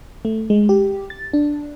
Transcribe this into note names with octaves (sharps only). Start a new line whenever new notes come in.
A3
G#3
G4
A6
D4